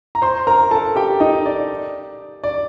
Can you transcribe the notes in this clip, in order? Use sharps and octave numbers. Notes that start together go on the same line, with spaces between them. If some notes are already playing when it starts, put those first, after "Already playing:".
A#5
C5 C6
A#4 A#5
A4 A5
G4 G5
D#4 D#5
D5
D5